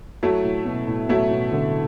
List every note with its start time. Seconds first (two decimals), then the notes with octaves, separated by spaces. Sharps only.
0.23 F#3 A3 E4
0.43 A2
0.66 B2
0.87 A2
1.09 B2 F#3 A3 E4
1.31 B2
1.52 D3